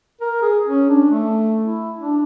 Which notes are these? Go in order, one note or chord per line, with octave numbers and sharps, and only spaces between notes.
A#4
G#4
C#4
D4
A3
E4
D4